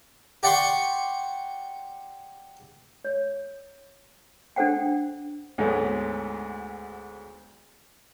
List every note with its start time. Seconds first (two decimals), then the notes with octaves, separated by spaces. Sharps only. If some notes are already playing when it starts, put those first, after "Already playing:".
0.43 G4 D5 F#5 G5 C6 C#6
3.05 C#5
4.56 C#4 D4 A4 C5 F#5 G5
5.58 D2 G#2 F#3 G#3 A3 B3